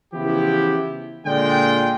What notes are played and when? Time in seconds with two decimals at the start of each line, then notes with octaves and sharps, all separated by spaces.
0.14 C#3 E3 F3 B3 E4 G4
1.26 A#2 D3 G#3 F4 D5 G5